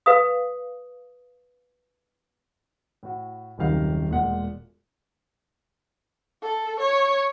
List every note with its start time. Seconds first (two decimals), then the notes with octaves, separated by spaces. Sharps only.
0.06 B4 F5 D#6
3.03 A2 F#4
3.58 D#1 F#2 C3 D#3 F5
4.10 E1 A#2 G#3 F#5
6.42 A4
6.80 C#5